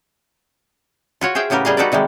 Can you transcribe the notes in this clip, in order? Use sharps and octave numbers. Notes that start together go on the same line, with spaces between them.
F4 F#4 C#5
G#4 C5 E5 F5 G5
A2 C#3 B3 G4 A#4
G3 G#4 D#5 F5
D#4 F#4 A4 B4 D5
C3 D#3 G3 G#3